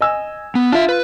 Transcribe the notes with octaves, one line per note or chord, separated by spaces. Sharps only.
D#5 G#5 E6
B3
D4 F4 E5
B4